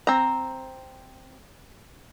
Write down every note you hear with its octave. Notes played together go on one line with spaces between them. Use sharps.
C4 A#5